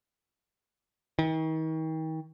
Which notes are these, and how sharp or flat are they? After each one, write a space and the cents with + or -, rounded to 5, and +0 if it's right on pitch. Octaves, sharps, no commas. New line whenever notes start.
D#3 +40